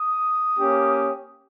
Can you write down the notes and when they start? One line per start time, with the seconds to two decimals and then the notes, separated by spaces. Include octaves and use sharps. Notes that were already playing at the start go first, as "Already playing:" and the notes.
Already playing: D#6
0.59 A#3 C#4 G4